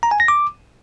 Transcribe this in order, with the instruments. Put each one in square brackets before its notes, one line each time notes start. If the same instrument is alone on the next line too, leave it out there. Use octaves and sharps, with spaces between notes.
[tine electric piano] A#5
G#5
A#6
D6